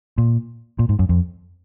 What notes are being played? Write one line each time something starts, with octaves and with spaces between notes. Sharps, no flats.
A#2
A#2
G#2
F#2
F2